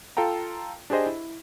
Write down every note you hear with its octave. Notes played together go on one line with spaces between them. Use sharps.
F4 A4 F5 G5 A#5
D4 G4 G#4 C5 D#5
E4